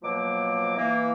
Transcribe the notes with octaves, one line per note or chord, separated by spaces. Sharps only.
B2 F3 F#3 A#3 D6
E3 A#3